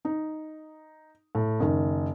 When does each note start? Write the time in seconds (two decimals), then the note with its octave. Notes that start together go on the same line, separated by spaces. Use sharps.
0.05 D#4
1.35 A2
1.60 F#1 D#3